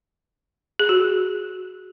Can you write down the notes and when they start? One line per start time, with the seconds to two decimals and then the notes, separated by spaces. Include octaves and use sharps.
0.79 G#4
0.89 F#4